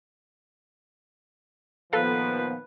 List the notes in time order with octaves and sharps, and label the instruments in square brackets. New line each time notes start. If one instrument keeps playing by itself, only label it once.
[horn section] A#2 D#3 F3 [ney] B3 [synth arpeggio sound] A4 F5 [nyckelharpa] B4